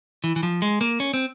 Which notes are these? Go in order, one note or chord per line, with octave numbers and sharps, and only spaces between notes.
E3
E3
F3
G#3
A#3
C#4
C4